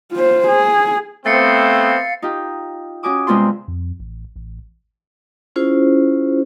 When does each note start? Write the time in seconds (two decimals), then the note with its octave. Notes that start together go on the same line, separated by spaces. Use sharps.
0.12 F4 C5
0.47 G#4
1.26 A3 B3 C4 F5 A6 C7 C#7
2.22 D#4 F4 G4
3.03 C#4 F#4 G#5 D6 D#6
3.27 G2 C3 G#3 B3 F4 C6
3.68 F2
4.00 A1
4.36 A1
5.56 C#4 E4 F4 G#4 C5